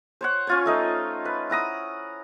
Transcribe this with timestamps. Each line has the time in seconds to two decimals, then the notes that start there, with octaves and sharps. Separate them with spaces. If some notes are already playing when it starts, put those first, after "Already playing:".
0.21 C5 C#5 F#5
0.47 C#4 F4 C#5
0.66 A3 D#4 D#5
1.25 B4
1.50 E4 F#5 A#5 D#6